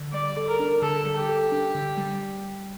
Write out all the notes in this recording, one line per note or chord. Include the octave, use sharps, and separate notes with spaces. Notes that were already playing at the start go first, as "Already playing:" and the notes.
Already playing: D3
G3 D5
A4
A#4
D4
D3 A4
G3
G4
A4
D4
D3
G3